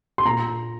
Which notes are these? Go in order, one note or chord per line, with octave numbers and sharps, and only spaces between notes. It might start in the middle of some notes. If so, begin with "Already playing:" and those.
C6
A#2 A#5